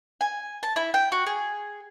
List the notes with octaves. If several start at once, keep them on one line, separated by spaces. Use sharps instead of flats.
G#5
A5
E4
G5
F#4
G#4